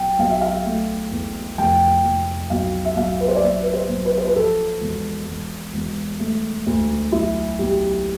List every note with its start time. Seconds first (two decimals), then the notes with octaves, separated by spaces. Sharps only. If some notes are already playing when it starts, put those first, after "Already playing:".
Already playing: B1 G5
0.19 B1 F5
0.30 E5
0.41 F5
0.66 A3
1.11 E2
1.58 F1 G5
2.03 F1
2.50 B1 F5
2.85 E5
2.96 B1 F5
3.20 B4
3.28 C5
3.36 D5
3.42 B1 E5
3.62 B4
3.74 C5
3.89 B1
4.05 B4
4.18 C5
4.27 B4
4.36 F3 A4
4.81 E1
5.28 E1
5.74 E1
6.20 A3
6.66 D2
7.12 B1 E4
7.59 B1 G4